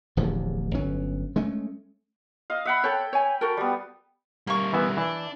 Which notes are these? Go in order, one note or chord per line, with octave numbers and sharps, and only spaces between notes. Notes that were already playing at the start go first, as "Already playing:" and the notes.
D1 A1 E2 F3
G1 F#3 C#4
G#3 A3 C#4
D#5 F5
E5 F#5 B5
A4 C#5 G5
C#5 G#5
F#4 A4 A#4
G3 B3
G3 A#3 A#4 C#6
E3 B3 E5
E3 D4